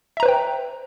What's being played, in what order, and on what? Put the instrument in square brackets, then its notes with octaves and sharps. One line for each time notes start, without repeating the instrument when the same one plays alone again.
[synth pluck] E5
A#5
B4
C5
G5